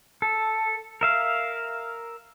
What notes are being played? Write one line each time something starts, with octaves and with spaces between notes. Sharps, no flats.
A4
A#4 E5 F5